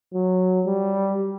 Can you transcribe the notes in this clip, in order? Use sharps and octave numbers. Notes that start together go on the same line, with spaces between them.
F#3
G3